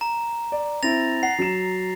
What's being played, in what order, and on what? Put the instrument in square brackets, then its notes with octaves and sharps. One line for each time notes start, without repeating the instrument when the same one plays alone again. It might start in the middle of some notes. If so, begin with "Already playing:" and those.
[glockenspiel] A#5
[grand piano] D5
[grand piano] C4 E4 [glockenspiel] A6 A#6 F7
[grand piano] F#5 [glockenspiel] C7
[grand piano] F#3 E7